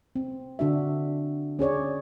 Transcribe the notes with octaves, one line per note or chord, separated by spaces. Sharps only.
C4
D3 D4 F#4 E5
C#4 G#4 C#5 D5